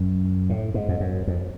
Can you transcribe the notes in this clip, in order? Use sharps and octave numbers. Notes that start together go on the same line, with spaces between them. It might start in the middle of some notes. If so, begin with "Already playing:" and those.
Already playing: F#2
A2
G#2
F2
F#2
F2